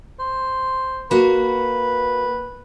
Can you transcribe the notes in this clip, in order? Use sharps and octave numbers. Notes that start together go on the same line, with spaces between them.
C5
A#3 F#4 B4 F5